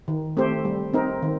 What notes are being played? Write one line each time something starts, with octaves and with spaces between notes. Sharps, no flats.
D#3
A3 C4 G4 C5
G3
C4 D#4 A#4
D#3